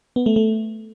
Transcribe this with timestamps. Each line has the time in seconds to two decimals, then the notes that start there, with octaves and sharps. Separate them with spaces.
0.16 B3
0.26 A3
0.36 A3